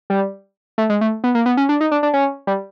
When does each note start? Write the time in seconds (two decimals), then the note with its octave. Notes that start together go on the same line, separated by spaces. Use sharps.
0.10 G3
0.78 A3
0.90 G#3
1.01 A3
1.24 B3
1.35 A#3
1.46 B3
1.57 C#4
1.69 D4
1.81 D#4
1.92 D4
2.03 D4
2.14 C#4
2.47 G3